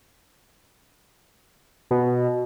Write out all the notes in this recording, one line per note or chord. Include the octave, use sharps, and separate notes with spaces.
B2